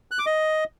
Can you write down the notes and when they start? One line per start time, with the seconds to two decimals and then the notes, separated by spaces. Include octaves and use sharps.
0.11 F#6
0.19 D6
0.26 D#5